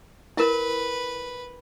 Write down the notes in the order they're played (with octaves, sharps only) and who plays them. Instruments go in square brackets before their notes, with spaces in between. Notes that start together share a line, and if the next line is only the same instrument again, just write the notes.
[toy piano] E4 A#4 [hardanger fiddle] B4